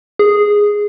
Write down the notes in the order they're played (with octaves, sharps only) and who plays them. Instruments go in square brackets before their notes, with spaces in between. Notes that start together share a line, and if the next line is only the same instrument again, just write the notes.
[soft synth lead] G#4